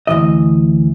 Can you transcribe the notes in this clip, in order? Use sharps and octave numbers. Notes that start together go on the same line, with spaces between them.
D2 B2 E3 D#5